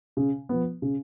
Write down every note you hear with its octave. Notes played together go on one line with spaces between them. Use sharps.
C#3
F3 B3
C#3